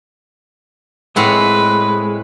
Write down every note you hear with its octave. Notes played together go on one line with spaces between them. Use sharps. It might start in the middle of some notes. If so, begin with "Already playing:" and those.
A2 G#3 C4 B4 F#5